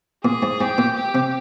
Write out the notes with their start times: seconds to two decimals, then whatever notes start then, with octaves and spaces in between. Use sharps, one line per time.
0.24 A#2 G#4
0.43 G#2
0.61 G#2 G4
0.78 A#2
0.96 G4
1.15 C3